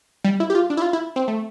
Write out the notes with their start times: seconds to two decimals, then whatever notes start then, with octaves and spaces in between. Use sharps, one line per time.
0.25 G3
0.40 E4
0.50 G4
0.55 F4
0.70 D4
0.77 E4
0.82 F4
0.93 E4
1.16 C4
1.28 A3